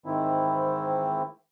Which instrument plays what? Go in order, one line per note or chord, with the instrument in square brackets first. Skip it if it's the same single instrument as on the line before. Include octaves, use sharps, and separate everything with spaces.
[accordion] G#2 D#3 E3 C4 E4